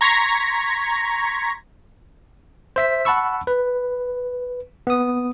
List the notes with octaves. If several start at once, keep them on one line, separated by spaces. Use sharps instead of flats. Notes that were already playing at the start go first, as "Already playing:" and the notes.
A#5 C6 C#6 G#6 A#6 B6
C5 E5 B6
F#5 A5 B5 C#6 E6
B4
B3 D#6